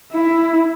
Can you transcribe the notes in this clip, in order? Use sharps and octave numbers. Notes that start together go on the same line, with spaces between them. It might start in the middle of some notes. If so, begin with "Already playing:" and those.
E4